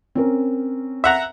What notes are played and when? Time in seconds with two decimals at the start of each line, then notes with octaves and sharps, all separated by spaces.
0.15 C4 C#4 A#4
1.04 E5 F#5 A#5